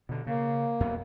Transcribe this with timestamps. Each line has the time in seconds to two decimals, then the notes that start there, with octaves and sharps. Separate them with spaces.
0.09 B2 D3
0.27 C#3 A#3
0.80 F#2 B3